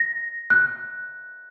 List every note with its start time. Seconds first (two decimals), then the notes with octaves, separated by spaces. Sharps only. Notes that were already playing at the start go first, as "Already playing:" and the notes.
Already playing: A#6
0.50 F#6